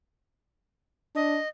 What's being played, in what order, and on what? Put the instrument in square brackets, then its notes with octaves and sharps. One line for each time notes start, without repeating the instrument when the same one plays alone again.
[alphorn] D4 [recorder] D#5